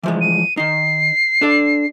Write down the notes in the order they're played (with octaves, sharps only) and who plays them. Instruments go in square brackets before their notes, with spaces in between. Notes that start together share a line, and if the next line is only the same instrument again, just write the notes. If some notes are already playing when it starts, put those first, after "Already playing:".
[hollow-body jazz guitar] E3 F3 G#3
[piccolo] D#7
[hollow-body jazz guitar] D#3 D#4 [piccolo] C7
[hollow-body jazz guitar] D4 A4 D5